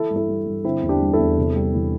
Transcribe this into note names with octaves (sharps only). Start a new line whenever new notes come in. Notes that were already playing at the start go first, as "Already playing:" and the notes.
Already playing: E3 E4 A4
G2
E4 A4
G3
G2
D3 C4 E4
E2
D4 G4
G3
E4 A4
E2
C3
G3
E3